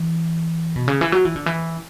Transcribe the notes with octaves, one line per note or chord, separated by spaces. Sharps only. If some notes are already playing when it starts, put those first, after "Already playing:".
Already playing: E3
B2
C#3
E3
F#3
E3
D3
E3